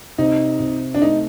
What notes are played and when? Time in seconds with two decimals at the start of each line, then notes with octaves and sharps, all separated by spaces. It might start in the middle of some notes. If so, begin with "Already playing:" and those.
0.18 C3 D#4
0.60 C3
0.94 D4
1.02 A3 D#4